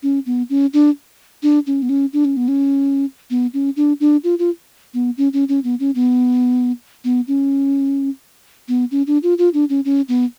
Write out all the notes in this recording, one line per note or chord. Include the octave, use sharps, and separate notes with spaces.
C#4
B3
C#4
D4
D4
C#4
B3
C#4
D4
C#4
B3
C#4
B3
C#4
D4
D4
F4
F4
B3
C#4
C#4
C#4
B3
C#4
B3
B3
C#4
B3
C#4
D4
F4
F4
D4
C#4
C#4
B3